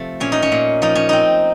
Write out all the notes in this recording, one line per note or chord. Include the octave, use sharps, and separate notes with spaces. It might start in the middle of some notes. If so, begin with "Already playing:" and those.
Already playing: C3 F3 A3 C4
A#2 C#4
D#4
C#4
A#2
F3 D#4
C#4
C4 D#4